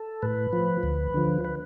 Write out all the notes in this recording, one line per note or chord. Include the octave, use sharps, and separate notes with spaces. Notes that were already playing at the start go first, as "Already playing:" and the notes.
Already playing: A4
A2 B4
F3
D2
D3 F3
B4